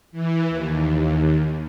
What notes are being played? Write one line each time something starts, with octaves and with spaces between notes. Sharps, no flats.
E3
D#2